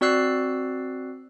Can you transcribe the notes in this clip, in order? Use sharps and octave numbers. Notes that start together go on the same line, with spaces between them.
C4 F#4 D5 E6 F#6 C7